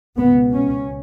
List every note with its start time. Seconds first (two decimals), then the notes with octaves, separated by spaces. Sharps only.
0.18 C#2 B2 B3
0.54 C#4